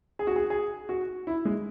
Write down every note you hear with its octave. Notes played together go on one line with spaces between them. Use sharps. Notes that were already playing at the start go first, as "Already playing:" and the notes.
G#4
F#4
G#4
G#4
F#4
E4
G#3